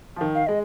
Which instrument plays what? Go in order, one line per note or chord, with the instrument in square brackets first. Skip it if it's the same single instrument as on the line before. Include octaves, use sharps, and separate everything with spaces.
[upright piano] F3
D#3
[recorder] F5
[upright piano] G#3 [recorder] D#5